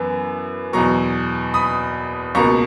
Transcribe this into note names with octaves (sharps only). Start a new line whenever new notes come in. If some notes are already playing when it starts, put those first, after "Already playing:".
Already playing: F#2 E3 B3
E2 B2 F#3 A#5 C#6
B5 D#6
C#2 B2 A#3 A#5 C#6